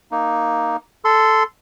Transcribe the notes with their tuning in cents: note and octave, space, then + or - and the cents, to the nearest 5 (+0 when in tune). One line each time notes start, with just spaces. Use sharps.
A#3 +0 D#4 +0
A4 +0 C6 -15